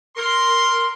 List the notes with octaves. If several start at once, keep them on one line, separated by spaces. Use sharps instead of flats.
A#4 C6